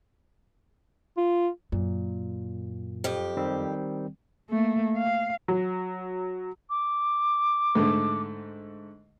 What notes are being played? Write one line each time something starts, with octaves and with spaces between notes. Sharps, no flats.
F4
F#2 A#2
F2 G4
D#3 G3 C4
A3 A#3
F5
F#3
D6
G#2 D3 A3